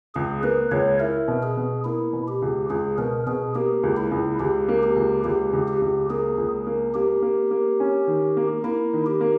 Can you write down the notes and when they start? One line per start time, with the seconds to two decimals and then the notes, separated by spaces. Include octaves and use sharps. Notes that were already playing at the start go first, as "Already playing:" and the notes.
0.15 C#2 G#4
0.43 A#3 B4
0.71 C#2 C#5
1.00 E4 A#4
1.28 B2
1.43 G#4
1.57 B2
1.85 A#3 E4
2.13 B2
2.28 G4
2.42 C#2
2.70 C#2 G#4
2.98 B2 A#4
3.27 B2 G#4
3.55 A#3 G4
3.83 C#2
3.97 E4
4.11 C#2
4.40 C#2 G4
4.68 A#3
4.83 G4
4.96 C#2
5.24 C#2 G4
5.53 C#2
5.68 G4
5.82 C#2
6.10 A#3 G#4
6.38 C#2
6.67 A#3
6.94 A#3 G4
7.22 A#3
7.51 A#3
7.80 C#4
8.07 D#3
8.37 A#3
8.64 A#3 E4
8.93 D#3
9.06 G4
9.21 A#3